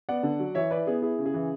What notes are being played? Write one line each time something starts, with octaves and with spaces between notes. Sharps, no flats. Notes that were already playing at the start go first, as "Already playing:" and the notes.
B3 D5 F#5
D3
F#3
E3 C#5 E5
E4 B4 D5
B3 G#4
E4 G#4
C#3
G#4
E3